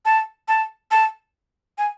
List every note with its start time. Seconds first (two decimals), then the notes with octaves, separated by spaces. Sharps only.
0.05 A5
0.48 A5
0.91 A5
1.78 G#5